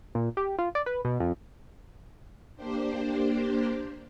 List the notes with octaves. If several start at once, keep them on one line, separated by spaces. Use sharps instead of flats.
A#2
G4
F4
D5
B4
B2
F2
A#3 D4 G4 C5